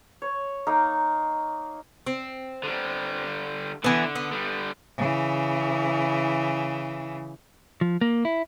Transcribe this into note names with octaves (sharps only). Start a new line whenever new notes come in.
C#5
A#3 D#4 A#4
C4
D3 G3
D3 E3 B3
B3
D3 G3
C#3 E3
F3
A#3
E4